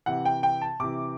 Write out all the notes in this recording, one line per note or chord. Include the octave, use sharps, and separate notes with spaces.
C3 E3 F#5
G5
G5
A5
C3 E3 D6